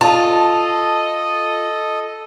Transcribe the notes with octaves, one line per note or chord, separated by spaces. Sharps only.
F4 A4 D#5 A5